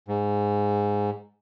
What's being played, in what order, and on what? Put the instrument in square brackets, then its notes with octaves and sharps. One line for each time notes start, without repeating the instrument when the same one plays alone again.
[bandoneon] G#2